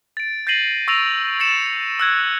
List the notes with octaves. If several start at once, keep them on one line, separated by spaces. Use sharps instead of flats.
A6 D7
G6 A6 A#6 C7 D#7 F#7
C#6 E6 A6 A#6 D7 F7
G6 A6 C#7 E7
E7
E6 F#6 G#6 A6